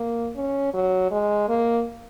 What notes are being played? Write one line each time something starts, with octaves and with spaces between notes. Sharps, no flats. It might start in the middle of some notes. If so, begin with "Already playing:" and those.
Already playing: A#3
C#4
F#3
G#3
A#3